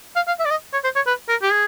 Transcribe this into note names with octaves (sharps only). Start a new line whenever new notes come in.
F5
F5
E5
D5
D#5
C#5
C5
C#5
B4
A#4
G4
G#4